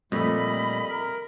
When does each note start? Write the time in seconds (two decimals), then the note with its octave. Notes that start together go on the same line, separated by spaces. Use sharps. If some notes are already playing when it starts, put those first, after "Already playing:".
0.12 F2 A#2 G3 A3 D#5 B5
0.90 A#4